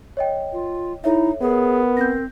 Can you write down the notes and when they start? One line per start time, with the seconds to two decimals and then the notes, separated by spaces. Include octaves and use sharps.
0.17 C#5 D#5 G5
0.53 F4
1.04 D#4 E4 A4 C#5 E5
1.41 B3 G#4 A#4
1.97 C4 G6 A#6